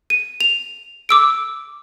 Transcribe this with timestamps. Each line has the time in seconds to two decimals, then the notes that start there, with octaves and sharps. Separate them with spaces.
0.10 D#7
0.41 F7
1.09 D6 E6 D7